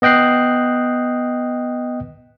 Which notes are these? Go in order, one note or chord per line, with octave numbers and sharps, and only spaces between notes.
B3 D#5 G5 F#6 C7